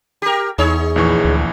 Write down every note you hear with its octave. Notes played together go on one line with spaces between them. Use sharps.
G4 A#4
E2 D#4 G#4 C#5
A#1 E3 C#6
D2